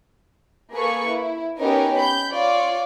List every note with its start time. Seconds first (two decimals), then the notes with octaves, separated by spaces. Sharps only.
0.72 A#3 G#4 A4 B4 C#6
1.10 E4
1.59 B3 C#4 D#4 G4 A#4 B4
1.98 B5 G6
2.32 F4 C#5 D5